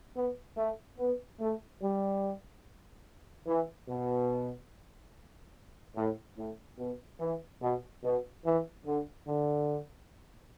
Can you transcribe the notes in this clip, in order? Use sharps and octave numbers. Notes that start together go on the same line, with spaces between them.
B3
A3
B3
A3
G3
E3
B2
A2
A2
B2
E3
B2
B2
E3
D3
D3